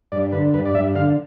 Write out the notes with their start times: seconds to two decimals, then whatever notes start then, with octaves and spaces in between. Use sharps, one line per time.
0.12 G2 D5
0.32 D3 B4
0.54 G2 B4
0.65 D5
0.75 G2 E5
0.95 D3 F5